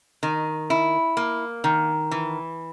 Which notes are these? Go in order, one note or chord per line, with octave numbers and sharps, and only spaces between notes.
D#3
E4
A#3
D#3
E3